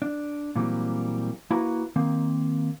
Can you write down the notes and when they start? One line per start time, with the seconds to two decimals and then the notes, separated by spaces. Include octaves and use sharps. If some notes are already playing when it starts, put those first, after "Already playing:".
0.02 D4
0.56 A#2 E3 F#3 G3 A#3 C4
1.51 A#3 E4 F#4 B4 A#5
1.96 D#3 A#3 C4